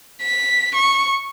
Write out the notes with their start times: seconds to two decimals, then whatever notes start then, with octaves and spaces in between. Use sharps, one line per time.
0.22 B6
0.75 C#6